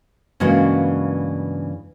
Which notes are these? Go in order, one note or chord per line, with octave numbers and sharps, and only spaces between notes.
G2 C#3 E3 G#3 A#3 F#4